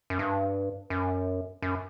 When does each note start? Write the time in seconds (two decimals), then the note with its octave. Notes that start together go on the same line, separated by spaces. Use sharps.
0.10 F#2
0.19 G2
0.90 F#2
1.62 F#2